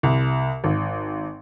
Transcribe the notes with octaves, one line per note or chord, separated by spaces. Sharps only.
C2
G#1